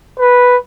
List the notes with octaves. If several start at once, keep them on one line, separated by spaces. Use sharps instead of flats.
B4